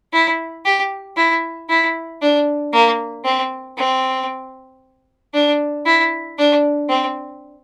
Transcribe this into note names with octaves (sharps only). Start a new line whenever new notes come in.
E4
G4
E4
E4
D4
A#3
C4
C4
D4
E4
D4
C4